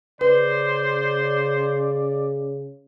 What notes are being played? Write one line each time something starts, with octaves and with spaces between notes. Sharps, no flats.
C#3 B4 C5 D5